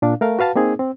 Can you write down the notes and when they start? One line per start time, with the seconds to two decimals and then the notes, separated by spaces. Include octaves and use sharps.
0.02 A#2 D4 F5
0.21 A3 A#4 F5
0.39 F#4 B4 F5 A5
0.55 A#3 C4 D#4 G#4
0.79 C4